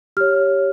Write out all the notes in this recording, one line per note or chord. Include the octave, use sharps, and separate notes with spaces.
G4 C#5 F6